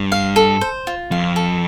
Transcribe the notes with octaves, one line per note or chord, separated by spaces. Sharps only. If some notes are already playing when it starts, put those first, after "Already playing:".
Already playing: G2
F5
A4
C5
F4
F2 F5
A4